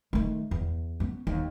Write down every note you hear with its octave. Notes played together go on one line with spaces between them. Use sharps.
D#3 A3
E2
B3 C#4
D#2